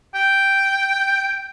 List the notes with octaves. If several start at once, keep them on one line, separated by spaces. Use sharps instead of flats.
G5